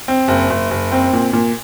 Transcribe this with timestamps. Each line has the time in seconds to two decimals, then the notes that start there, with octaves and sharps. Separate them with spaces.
0.08 C4
0.28 F#1
0.50 F#1
0.71 F#1
0.92 C4
1.13 A#2
1.33 A#2